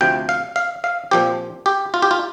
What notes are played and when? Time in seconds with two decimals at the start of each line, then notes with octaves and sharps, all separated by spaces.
0.01 D2 C3 F3 G5
0.29 F5
0.56 F5
0.84 F5
1.11 A#2 F3 C4 G4
1.66 G4
1.94 F4
2.02 G4
2.11 F4